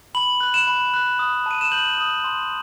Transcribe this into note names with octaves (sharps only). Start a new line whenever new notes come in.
B5 F#7
F#6
E7
B5
F#6
D#6
A5 D#7
E7
G6 F#7
D#6
C6